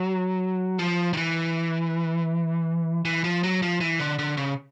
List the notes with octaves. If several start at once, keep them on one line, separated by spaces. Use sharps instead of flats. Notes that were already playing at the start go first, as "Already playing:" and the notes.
Already playing: F#3
F3
D#3
E3
E3
F3
F#3
F3
E3
D3
D3
C#3